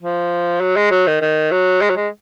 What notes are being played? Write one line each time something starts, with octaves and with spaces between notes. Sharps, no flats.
F3
F#3
G#3
F#3
D#3
D#3
F#3
G#3
F#3
G#3